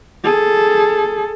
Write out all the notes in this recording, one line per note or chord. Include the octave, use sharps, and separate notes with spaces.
G#4 A4